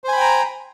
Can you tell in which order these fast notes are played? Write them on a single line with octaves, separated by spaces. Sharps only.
C5 G#5 B5 G5 A#5